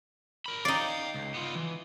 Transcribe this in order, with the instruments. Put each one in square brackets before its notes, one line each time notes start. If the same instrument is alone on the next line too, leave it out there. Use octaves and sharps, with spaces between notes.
[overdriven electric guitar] A#4 B5
[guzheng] D#4 D5 [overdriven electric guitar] F5 G5
[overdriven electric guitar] C#2
B3 F4
E3